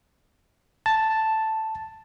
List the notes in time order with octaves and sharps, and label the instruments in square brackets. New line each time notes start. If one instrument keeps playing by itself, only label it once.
[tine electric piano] A5